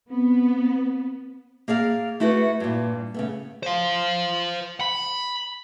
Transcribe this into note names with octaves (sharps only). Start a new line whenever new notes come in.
B3 C4
A#3 G#4 D5 F5
A3 E4 F#4 G#4 B4
G2 A#2
C#3 A3 B3
C5 F5
B5